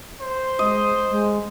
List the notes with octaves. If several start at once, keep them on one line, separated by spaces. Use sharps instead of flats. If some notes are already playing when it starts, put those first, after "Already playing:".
C5
G#3 D#5
G#3